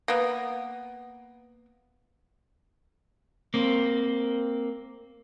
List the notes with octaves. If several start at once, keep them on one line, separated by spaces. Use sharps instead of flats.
A#3 B3
A#3 C4